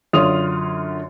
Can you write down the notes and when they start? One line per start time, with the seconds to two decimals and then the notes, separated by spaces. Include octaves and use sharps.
0.13 F#2 D3 F4 C#5 D#6 F7